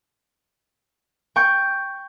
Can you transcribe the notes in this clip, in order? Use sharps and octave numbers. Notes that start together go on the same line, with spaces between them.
G5 C#6 G6